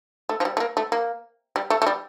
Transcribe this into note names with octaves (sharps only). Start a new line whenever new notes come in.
A3
F3
G3
A3
A#3
A3
A#3
G3
A3
A3
G3